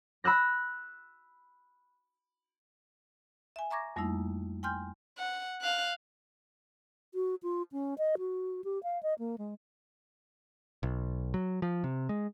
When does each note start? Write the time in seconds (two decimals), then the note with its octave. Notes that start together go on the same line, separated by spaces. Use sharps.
0.24 B5 E6 F#6 A#6
3.56 E5 G#5
3.71 E5 A#5 C#6 D6 G#6 A#6
3.96 F2 G3 A3 A#3 D#4 E4
4.63 G5 G#5 C6 F6 G6
5.18 F#5
5.61 F5 F#6
7.14 F#4
7.43 F4
7.72 C#4
7.98 D#5
8.18 F#4
8.64 G4
8.83 F5
9.03 D#5
9.19 A#3
9.38 G#3
10.83 B1
11.34 F#3
11.62 F3
11.84 C3
12.09 G#3